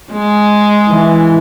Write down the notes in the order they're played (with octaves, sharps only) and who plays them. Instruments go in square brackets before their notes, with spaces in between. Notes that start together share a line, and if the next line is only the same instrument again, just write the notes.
[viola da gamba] G#3
[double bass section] E3